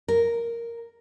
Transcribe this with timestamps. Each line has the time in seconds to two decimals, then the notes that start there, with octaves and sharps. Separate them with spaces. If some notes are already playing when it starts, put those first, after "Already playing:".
0.08 A#4